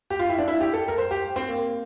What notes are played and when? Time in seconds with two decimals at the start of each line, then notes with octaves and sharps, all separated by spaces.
0.10 G4
0.19 F4
0.29 E4
0.38 D4
0.48 E4
0.60 G4
0.73 A4
0.88 A#4
0.98 C5
1.11 G4
1.36 C4
1.49 A#3